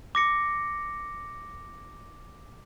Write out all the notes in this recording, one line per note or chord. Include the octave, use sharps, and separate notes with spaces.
D6 A#6 C#7